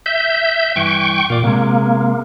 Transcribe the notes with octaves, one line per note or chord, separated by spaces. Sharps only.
E5 G6
G2 E3 G5 C#6
A#2 F4 D5
C3 G#3 A#3